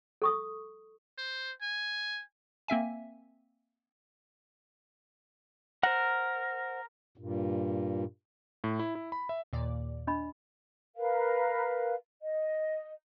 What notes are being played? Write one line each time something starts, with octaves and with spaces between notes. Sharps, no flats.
A4 C#6 D#6
C5
G#5
A#3 C4 E5 G#5
A#4 C5 F#5
G2 A#2
A2
E4
E4
B5
E5
D#2 A#2 D5
D4 D#5 B5
A#4 B4 F5
D#5